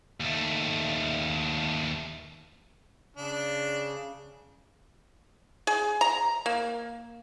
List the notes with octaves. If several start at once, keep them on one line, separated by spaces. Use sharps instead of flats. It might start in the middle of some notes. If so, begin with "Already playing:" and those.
D#2 A3
C#3 D4
G#4
A#5
A#3